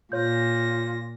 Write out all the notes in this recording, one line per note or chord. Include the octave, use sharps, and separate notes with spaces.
A#2 F4 C#5 G6 A#6